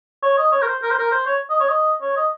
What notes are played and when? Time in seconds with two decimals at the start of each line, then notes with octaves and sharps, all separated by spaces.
0.23 C#5
0.38 D#5
0.52 C#5
0.62 A#4
0.67 C5
0.82 A#4
0.90 C5
0.99 A#4
1.12 C5
1.26 C#5
1.50 D#5
1.60 C#5
1.69 D#5
2.01 C#5
2.16 D#5